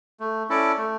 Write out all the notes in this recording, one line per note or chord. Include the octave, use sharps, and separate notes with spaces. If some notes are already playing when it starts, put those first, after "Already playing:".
A3
C#4 E4 A4 D5
A3